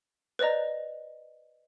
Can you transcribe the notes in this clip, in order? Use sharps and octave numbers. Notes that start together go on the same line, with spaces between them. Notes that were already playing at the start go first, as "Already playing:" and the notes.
B4 C5 D5 D#5 A#5